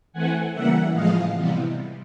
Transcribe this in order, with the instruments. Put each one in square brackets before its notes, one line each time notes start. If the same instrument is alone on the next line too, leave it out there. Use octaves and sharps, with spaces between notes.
[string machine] E3 A3 C4 F#5 G#5
C#3 E3 G3 A#3 E5 F#5
A2 F3 G#3 D#5 F5
C3 E3 G3 B3